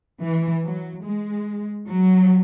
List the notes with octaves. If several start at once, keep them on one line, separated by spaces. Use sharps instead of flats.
E3
F#3
G#3
F#3